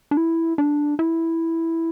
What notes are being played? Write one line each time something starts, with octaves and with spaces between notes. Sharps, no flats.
D4
E4
D4
E4